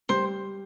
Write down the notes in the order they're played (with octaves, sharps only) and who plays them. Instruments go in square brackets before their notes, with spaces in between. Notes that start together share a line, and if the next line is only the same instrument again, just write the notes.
[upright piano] G3 [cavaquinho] C5